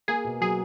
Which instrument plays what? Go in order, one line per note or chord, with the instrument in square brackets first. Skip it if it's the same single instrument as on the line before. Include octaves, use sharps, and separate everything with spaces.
[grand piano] A#3 [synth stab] G#4
[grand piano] B2
[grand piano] F#3 [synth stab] G#4